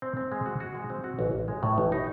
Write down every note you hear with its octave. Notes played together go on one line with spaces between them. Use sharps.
C4
C4
G#3
F#4
F#4
G#3
C4
F#4
A1
A1
G#3
A2
A1
D#4